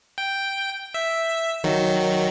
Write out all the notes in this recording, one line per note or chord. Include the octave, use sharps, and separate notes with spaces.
G5
E5
D#3 F#3